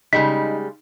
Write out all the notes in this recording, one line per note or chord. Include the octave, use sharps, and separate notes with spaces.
C#3 G3 G#3 D#4 B6